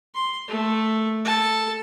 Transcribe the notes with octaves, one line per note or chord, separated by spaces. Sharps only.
C6
A3
A4 A5